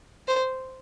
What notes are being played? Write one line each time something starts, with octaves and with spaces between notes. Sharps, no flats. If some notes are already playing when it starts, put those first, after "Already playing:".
C5